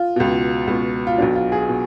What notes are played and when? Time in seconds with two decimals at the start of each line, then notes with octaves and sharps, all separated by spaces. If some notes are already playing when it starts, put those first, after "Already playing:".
Already playing: F4
0.16 C#2 B2
0.67 C#2 B2
1.07 F4
1.18 B1 B2 D4
1.35 F4
1.52 G#4
1.69 B2